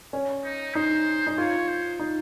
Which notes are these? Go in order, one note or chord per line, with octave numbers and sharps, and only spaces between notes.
C#4
D#4
D#4 C5
D#4
F4 C#5
C5
D#4